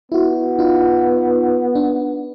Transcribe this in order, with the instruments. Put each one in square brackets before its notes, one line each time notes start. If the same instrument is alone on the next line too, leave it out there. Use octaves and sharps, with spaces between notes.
[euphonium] B3 [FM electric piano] E4 F#4
[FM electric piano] D#4 F4
D4